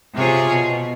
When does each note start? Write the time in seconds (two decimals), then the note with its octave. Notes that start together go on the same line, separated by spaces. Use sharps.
0.15 C3 F4 G#4 C#5
0.51 B2